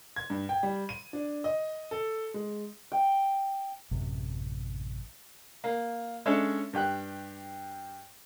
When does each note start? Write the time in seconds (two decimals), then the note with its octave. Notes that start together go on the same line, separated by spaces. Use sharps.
0.16 G#6
0.30 G2
0.49 G5
0.63 G3
0.89 D#7
1.13 D4
1.44 D#5
1.91 A4
2.34 G#3
2.92 G5
3.91 A1 F#2 C3
5.64 A#3
6.26 G#3 C#4 D4 A4 C#5 E5
6.73 G2 G4 G5 F#6